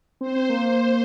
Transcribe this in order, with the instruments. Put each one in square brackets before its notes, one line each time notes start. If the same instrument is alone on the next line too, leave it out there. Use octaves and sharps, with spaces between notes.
[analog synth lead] C4 [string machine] C5
[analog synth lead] C4
A#3
[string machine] C5